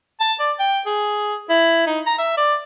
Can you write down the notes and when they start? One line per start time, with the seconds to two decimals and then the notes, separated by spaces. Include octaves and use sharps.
0.20 A5
0.40 D5
0.60 G5
0.86 G#4
1.49 E4
1.87 D#4
2.07 A#5
2.18 E5
2.37 D5